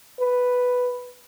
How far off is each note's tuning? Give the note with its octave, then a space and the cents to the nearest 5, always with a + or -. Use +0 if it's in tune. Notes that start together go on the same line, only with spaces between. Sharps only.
B4 +0